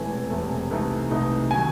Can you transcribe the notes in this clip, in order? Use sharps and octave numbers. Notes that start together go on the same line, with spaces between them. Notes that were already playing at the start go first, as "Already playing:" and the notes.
Already playing: E1 E2 C3 E3 A3 G#5
E1 E2 C3 E3 A3
C2 C3 E3 A3 D#4
C2 C3 E3 A3 D#4
D#3 F#3 G#5